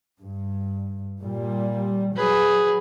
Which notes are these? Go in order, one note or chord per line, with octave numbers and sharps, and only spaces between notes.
G2
A#2 G3
F#3 G#4 B4